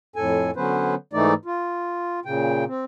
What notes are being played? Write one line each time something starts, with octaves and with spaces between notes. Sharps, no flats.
F2 A2 A4 G#5
D3 F#3 B3 C#4 B4 C5
G#2 E3 A3 D#4 D5
F4
A#2 C#3 G5
C4